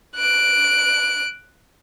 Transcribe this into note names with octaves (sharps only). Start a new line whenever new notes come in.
F#6 D7